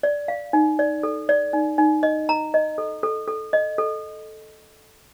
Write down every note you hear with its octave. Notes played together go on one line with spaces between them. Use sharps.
D5
F5
D#4
D5
A4
D5
D#4
D#4
D#5
A#5
D#5
A4
A4
A4
D#5
A4